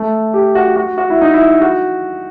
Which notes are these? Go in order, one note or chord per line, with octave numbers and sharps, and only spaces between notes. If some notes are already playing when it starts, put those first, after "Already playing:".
Already playing: A3
G4
F#4
F#4
F#4
E4
D#4
E4
F#4